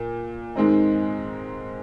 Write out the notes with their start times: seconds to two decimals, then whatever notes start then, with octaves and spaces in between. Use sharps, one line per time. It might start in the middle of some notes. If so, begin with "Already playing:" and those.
Already playing: A#2
0.56 G#2 D#3 G#3 C4 D#4